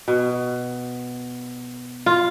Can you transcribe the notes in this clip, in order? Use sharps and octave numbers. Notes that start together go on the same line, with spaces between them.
B2
F4